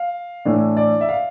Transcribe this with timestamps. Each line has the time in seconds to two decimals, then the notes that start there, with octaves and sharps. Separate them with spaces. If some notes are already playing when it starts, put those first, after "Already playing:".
Already playing: F5
0.45 A2 E3 A3 D4
0.77 D5
1.01 E5
1.09 F5